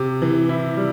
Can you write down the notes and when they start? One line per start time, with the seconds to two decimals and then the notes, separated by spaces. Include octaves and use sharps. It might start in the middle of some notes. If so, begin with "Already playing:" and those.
Already playing: C3
0.22 E3
0.49 E4
0.77 G3